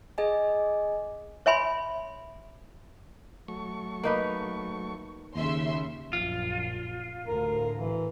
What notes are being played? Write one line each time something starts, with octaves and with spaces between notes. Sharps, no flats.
G#4 D#5 G#5
C#5 E5 G#5 B5 C6
F#3 A3 C#6
A#3 D#4 B4
D#2 C#3 E5 C6
A#1 F#2 F4
D2 A2 A#4
E3